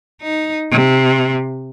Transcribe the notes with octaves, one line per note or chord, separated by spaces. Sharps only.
D#4
C3